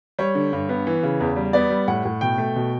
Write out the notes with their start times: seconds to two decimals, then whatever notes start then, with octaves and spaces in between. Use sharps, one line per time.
0.19 G3 C#5
0.35 D3
0.53 G2
0.69 B3
0.87 E3
1.03 C#3
1.20 E2
1.36 G3
1.53 B3 D5
1.70 G3
1.88 A2 F#5
2.05 A2
2.21 B2 G5
2.38 A3
2.56 B2